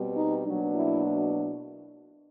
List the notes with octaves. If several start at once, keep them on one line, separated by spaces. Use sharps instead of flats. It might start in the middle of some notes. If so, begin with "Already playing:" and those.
Already playing: B2 G3 C4
D#4
B2 F#3 A#3 D4
E4